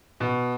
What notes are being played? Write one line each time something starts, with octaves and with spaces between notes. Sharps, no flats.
B2